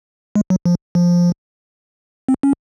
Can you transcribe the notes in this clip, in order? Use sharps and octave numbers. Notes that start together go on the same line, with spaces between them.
G#3
F#3
F3
F3
C4
C#4